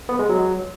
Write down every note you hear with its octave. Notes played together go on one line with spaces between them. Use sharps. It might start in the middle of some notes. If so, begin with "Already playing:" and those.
B3
G#3
F#3